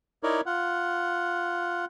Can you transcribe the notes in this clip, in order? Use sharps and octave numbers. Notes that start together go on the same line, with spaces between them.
D#4 E4 A#4 C#5 D5
F4 F#5